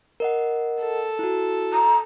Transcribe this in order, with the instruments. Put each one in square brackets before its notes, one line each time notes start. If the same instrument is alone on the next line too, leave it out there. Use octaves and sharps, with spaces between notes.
[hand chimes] A#4 D#5 F#5
[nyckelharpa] A4
[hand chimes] E4 F#4
[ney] A#5